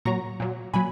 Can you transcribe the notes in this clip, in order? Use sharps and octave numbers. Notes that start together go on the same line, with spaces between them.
A#2 F#3 A#5 C#6
A#2 F#3
A#2 F#3 G#5 B5